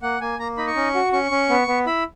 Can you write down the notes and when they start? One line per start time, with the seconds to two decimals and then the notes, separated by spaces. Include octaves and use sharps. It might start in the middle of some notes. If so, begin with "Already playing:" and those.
0.02 A#3 F#5
0.21 A#3 G#5
0.39 A#3 A#5
0.57 D#4 B5
0.67 C#6
0.76 C#4
0.94 F#4
1.13 C#4 C#6
1.31 C#4
1.49 B3
1.68 B3
1.86 E4 B5